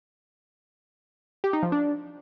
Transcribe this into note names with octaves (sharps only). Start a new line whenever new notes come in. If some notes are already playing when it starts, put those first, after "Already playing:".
G4
D#4
F3
D4